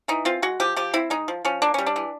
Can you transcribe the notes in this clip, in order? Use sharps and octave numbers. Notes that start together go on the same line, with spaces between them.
E3 D#4
C4 F4
G#3 F#4
F3 G4
F3 G4
C4 E4
G#3 D#4
F3
F3 C#4
A#3 D4
G3 C#4
D4
E3